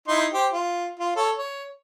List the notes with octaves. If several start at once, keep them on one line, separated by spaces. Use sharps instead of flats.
D#4 E4 C6
G4 C5
F4
F4
A4 C#5
C#5